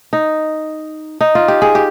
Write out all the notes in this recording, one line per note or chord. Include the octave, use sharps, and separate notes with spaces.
D#4
D#4
F4
G4
G#4
G4